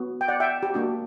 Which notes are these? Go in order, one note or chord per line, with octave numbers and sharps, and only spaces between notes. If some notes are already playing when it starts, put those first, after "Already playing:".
Already playing: B3 F#4
G5
D5 F#5
E5 G5
G4
A#3 D4 F#4